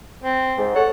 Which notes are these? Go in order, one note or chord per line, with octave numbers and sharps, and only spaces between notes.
C4
G#2
A4 C#5 F#5